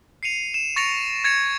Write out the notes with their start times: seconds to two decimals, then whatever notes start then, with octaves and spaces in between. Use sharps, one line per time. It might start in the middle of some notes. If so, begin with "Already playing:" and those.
0.23 C7 C#7 D#7 F7
0.54 E7
0.76 C#6 A6 A#6 C#7 D7 F7
1.24 G#6 A6 C#7 F7